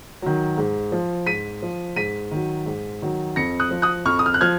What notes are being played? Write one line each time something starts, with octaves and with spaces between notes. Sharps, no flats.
D#3 F#3
G#2
F3
G#2 B6 D#7
F3
G#2 B6 D#7
D#3 F#3
G#2
D#3 F#3
F2 A#6 C#7
D#6 F#6
F3
D#6 F#6
F2 C#6 F6
D#6
F6
F#6
F3 F6 G#6